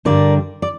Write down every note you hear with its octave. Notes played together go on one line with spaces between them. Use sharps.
G2 D3 G3 A#4 D5
D5